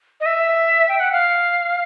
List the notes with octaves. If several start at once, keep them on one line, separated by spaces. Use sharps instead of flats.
D#5
E5
G5
F#5
F5